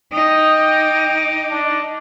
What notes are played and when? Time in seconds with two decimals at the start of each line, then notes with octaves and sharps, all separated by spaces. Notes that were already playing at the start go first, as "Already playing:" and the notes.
0.13 D#4 G5 D#6
0.57 D6
1.50 D4